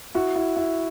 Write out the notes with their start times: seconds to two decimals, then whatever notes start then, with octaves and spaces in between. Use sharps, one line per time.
0.15 E4 F#4
0.35 E4
0.56 E4